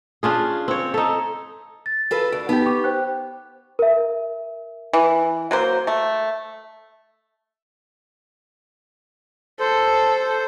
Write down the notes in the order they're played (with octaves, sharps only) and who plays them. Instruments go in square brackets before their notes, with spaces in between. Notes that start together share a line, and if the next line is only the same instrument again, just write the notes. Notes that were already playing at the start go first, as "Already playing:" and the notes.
[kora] C#4 D4 F4 G#4
C4 C#5
D#4 A4
[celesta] A6
[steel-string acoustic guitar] F4 A4 B4
[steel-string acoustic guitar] D2 [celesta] D7
[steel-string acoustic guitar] B3 G4 [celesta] D#4
[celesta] G5 C#6 D6
C5 G5 F#6
A#4 E5
[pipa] E3
F#3 A#3 C5
A3
[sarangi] A4 [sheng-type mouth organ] C5